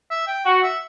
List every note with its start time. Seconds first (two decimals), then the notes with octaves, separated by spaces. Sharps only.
0.10 E5
0.28 G5
0.46 F#4
0.63 E5